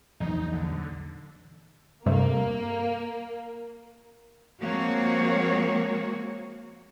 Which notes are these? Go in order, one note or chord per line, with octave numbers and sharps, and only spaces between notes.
A#1 E2 F#3 D#4
D3
G2 C3 A3 A#3
F3 G#3 A#3 C4 F#4 C#5